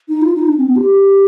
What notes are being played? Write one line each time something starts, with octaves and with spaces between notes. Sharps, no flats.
D#4
F4
D#4
D4
C4
B3
G4